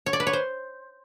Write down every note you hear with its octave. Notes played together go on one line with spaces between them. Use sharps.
C#5
D5
B4
C#5
C5